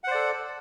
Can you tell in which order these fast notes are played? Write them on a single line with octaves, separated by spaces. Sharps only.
F#5 C5 D5 A4